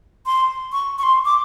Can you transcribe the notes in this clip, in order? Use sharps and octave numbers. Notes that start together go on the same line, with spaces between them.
C6
C#6
C#6
C6
D6